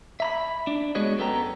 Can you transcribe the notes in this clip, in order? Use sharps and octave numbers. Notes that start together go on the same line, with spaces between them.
E5 A#5 B5
D4
G#3 B3 F#4 G#4 C#5 D#5
F#2 B3 A4 G5 A#5